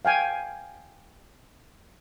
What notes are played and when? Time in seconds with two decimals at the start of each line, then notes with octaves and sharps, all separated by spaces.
0.05 F5 G5 G#5